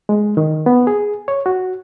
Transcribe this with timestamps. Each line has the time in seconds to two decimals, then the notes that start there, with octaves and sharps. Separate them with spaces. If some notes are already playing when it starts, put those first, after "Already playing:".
0.09 G#3
0.37 D#3
0.66 B3
0.87 G#4
1.28 C#5
1.46 F#4